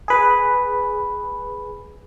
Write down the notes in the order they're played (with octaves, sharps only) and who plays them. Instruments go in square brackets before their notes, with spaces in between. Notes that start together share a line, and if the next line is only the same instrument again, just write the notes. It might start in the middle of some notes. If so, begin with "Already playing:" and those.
[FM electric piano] G#4 B4